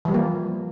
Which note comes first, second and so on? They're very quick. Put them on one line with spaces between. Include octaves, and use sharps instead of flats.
E3 G3 F3 A#3